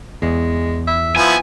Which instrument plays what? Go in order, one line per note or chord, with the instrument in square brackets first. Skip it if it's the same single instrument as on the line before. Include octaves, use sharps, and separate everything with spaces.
[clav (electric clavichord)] E2 [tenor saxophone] G#3
[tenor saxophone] E5
[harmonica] F3 B3 E4 [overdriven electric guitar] G#5